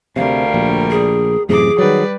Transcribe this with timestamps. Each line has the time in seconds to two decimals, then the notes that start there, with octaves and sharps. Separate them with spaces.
0.16 D2 C3 G3 A#4 F5
0.54 A#1
0.91 G#4
1.49 F#2 A2 C3 E3 G#4 D6
1.78 D#3 F#3 G3 B4 D5